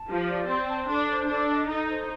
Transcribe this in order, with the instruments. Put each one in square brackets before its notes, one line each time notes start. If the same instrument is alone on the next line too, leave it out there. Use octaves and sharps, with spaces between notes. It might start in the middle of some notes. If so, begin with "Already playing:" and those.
Already playing: [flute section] A5
[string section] F3 [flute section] G4
[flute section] D5
[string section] C4 [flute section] C6
[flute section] A5
[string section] D4 [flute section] A4
[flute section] C5
[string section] D4 [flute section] A4
[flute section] D#5
[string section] D#4 [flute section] A4
[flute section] C5